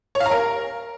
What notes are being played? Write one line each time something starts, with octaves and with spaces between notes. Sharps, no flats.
C#5
F5
A#5
A#4